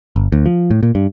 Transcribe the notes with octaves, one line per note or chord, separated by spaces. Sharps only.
G1
D2
F3
A2
A#2
G2